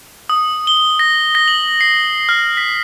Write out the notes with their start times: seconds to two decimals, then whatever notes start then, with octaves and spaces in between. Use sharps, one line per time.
0.29 D#6
0.67 G7
0.99 A#6
1.35 A#6
1.48 F#7
1.81 C7
2.29 F6
2.57 B6